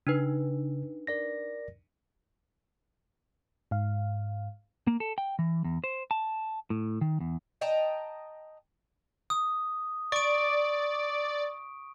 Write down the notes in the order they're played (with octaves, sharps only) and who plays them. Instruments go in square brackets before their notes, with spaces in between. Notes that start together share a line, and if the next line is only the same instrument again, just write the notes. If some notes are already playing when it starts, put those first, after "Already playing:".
[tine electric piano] C#3 [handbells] D4 D#4 B4
[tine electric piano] A#4 D5 A#6
[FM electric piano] G#2 F5
[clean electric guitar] A#3
A4
G5
E3
E2
C5
A5
A2
D#3
E2
[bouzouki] D#5 G5 A5 A#5
[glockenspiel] D#6
[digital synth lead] D5 [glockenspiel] C#6 D7